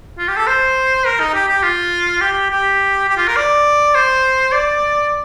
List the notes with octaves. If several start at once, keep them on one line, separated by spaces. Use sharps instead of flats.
F4
G4
A4
C5
A#4
D#4
G4
G4
F4
G4
G4
G4
F4
A#4
D5
C5
D5